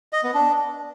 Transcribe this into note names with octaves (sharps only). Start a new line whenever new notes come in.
D#5
B3
D4